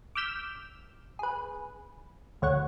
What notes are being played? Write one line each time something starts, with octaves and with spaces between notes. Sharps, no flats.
D6 E6 F6 G6 B6 E7
G#4 B4
D2 C#5 F#5